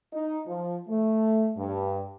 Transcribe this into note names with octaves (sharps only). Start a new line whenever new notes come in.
D#4
F3
A3
G2